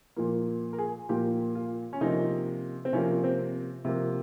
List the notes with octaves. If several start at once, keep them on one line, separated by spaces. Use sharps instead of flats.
A#2 F3 A#3 F4
A#4
G#4
A#2 F3 A#3 G4
F4
C#4
C3 F3 A#3 D#4
C4
C3 F3 A#3 C#4
C4
C3 F3 A#3